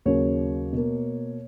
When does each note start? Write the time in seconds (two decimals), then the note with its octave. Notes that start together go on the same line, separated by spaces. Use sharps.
0.05 D#2 C#3 F#3 A#3 C#5
0.73 B2 A#3